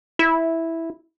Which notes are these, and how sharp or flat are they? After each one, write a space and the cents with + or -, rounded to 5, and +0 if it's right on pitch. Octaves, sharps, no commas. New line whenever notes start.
E4 -5